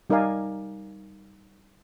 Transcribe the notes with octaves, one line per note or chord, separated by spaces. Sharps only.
G3 D#4 A#4 D5 F5 G#5